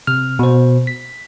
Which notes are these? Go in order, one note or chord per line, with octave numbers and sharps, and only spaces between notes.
C3 F6
B2 C5
B6